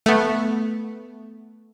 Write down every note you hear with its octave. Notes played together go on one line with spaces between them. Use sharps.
A3 B3